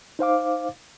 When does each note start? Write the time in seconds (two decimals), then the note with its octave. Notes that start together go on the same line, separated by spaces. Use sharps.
0.19 D#4 C5 F5 D6